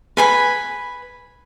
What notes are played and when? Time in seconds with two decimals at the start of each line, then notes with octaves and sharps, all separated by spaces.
0.17 B4 G#5 B5